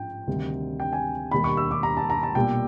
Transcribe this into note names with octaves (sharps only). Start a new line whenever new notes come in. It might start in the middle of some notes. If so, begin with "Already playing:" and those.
Already playing: A1 G#2 F3 G5
D2 C3 D#3 G3
G5
G#5
E1 D#2 D#3 G3 B5
C#6
E6
D6
A#5
A5
A#5
A5
B1 A#2 G3 G5